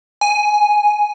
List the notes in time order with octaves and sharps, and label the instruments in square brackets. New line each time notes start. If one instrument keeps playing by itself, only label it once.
[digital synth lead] G#5